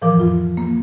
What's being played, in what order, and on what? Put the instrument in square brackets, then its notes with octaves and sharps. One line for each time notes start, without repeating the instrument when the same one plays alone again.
[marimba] A2 E3 F3 A#4 D6
F2 F4
A#3